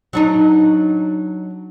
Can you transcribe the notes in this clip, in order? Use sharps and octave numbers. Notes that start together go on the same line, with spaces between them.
F#3 D4 D#4